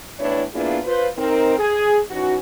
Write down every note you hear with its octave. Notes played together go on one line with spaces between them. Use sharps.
E2 A2 D4 E4 B4 C#5
A#3 B3 D4 E4 F4 G#4
F4 B4 C5
C4 D#4 A#4
G#4
E3 C#4 D#4 F#4